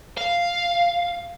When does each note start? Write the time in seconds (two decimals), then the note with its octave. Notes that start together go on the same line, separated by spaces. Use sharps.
0.18 F5